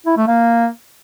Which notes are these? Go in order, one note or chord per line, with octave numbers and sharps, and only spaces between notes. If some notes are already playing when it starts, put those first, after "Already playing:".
E4
A3
A#3